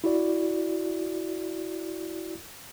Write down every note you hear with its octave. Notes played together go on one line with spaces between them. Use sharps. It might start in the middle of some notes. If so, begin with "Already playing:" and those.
E4 F#4 D5